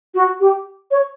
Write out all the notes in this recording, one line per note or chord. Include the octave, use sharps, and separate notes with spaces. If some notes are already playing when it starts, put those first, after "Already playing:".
F#4
G4
C#5